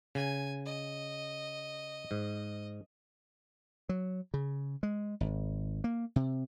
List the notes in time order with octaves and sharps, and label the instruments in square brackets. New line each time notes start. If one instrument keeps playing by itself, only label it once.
[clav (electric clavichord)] C#3 [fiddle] G#5
[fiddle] D#5
[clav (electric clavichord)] G#2
[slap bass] F#3
C#3
G#3
G#1
A#3
C3